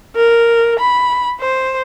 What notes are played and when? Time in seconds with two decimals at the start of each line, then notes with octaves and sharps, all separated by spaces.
0.16 A#4
0.79 B5
1.40 C5